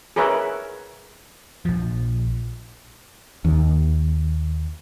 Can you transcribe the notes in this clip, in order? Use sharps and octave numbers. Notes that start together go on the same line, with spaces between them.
G#4 A#4 B4 C#5 E5
A#1 F3
D#2